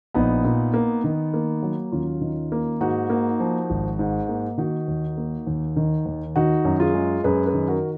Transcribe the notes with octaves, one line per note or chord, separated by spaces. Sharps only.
A#1 B3 D#4
A#2
A#3
D#3
A#3
F#3
D#2 C#4 F4
D#3
A#3
G#2 D#4 F#4
A#3
F3
G#1
G#2
A#3
D#3 D#4 F#4
D#2
A#3
D#2
D#3
D#2
D#3 D#4 F#4
F#2
F4 G#4
G#3
F#2 G#4 B4
G#4 B4
D#3
F#4 A#4